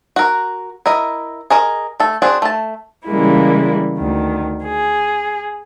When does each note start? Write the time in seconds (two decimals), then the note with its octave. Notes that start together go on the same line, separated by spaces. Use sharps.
0.16 F#4 A#4
0.86 E4 A#4 D#5
1.50 G#4 A#4 D#5
2.00 A3 A4
2.22 C4 D4 F#4 G#4
2.42 A3 A5
3.07 C#3 E3 G3 G#3 A#3 E4
3.98 D2 D#3
4.65 G#4